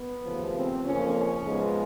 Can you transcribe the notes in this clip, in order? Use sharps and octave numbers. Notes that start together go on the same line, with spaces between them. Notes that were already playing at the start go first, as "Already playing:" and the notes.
Already playing: B3
D#2 C#3 F3 A3
C4
F2 C#3 F3 A#3 C#4
C#4
G#2 F3 G#3 B3